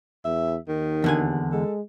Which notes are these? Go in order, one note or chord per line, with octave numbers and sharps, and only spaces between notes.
E2 E5
D#2 D#3
E2 D3 G#5
G#3 A4